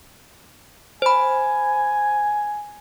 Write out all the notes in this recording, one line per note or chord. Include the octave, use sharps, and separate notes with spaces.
C5 G#5 B5